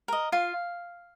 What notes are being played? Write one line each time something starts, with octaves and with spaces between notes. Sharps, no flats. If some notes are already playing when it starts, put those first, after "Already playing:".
A#4 D#5
F4 F5